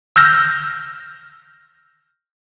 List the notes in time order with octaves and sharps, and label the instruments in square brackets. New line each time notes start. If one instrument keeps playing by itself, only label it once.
[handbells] E6 F6 G6 A#6